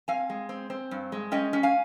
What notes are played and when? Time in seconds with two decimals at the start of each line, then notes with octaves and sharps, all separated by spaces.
0.08 C4 F5 G#5
0.30 G#3
0.49 C4
0.70 C4
0.91 G2
1.12 G#3
1.32 C#4 D#5 G5
1.53 C#4
1.63 F5 G#5